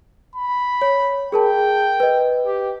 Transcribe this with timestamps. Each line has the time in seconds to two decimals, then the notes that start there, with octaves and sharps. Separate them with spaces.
0.35 B5
0.82 C#5
1.32 G#4 A#4 G5 A5
2.00 B4 D#5
2.46 G4